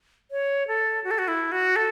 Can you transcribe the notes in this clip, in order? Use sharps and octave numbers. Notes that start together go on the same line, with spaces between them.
C#5
A4
F#4
A4
F#4
E4
F#4
A4